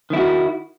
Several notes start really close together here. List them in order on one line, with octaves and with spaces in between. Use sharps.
D#3 E4 F#4